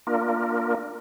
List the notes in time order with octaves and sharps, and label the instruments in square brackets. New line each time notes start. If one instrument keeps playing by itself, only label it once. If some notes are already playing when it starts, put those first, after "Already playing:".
[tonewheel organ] A#3 D4 F4 A#4